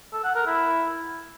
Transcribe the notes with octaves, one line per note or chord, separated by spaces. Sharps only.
A4
F#5
A#4
E4